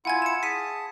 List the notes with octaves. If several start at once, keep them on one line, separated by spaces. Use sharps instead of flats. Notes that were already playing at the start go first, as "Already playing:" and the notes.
E4 F4 F#5 G#5 G#6
C#7 E7
G#4 A5 B6 D#7